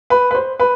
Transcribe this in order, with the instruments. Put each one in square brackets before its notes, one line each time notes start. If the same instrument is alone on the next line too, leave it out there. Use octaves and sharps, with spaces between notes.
[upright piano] B4
B4
C5
B4